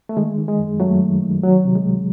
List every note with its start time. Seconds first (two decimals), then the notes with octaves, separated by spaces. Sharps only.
0.09 A3
0.17 D#3 G#3
0.38 D#3
0.48 G#3
0.59 F#2
0.80 F#2 F#3 A3
1.01 D#3
1.22 D#3
1.43 C2 F#3
1.65 C3
1.75 G#3
1.86 C2